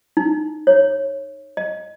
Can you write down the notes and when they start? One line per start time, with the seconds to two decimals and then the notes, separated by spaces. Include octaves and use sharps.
0.17 D#4
0.67 C#5
1.57 D#5